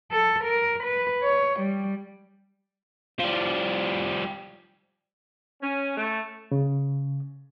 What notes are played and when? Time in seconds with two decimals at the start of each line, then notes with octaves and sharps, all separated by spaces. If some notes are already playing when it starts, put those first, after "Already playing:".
0.11 A4
0.44 A#4
0.83 B4
1.23 C#5
1.60 G3
3.20 F3 G3
5.62 C#4
5.97 A3
6.51 C#3